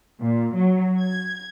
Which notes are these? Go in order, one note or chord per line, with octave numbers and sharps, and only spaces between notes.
A#2
F#3
G#6